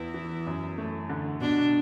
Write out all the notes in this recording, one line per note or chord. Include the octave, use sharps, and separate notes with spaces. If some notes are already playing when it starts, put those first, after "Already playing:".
Already playing: E2 B3 E4
E3
F#2
A3
D3
B2 D4